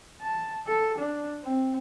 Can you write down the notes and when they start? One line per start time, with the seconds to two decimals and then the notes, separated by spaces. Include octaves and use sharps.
0.21 A5
0.67 A4
0.97 D4
1.43 C4